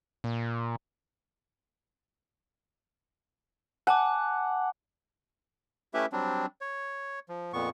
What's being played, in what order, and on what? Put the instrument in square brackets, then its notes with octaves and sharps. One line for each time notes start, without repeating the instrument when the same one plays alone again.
[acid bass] A#2
[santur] F#5 [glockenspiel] G#5 A5 D6
[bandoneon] A3 C#4 E4 G4 B4 E5
F#3 G3 C4 D4
C#5
F3
F2 A#2 B3 C#6